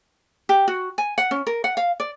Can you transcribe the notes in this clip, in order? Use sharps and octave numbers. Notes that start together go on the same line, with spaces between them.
G4
F#4
G#5
F#5
C#4
A#4
F#5
F5
D5